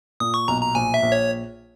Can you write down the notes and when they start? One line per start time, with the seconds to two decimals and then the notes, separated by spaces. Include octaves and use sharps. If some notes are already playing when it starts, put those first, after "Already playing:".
0.20 A#2 D#6
0.34 C#6
0.48 B1 A#5
0.62 A#5
0.75 A#1 G#5
0.94 E5
1.03 A#1
1.12 C#5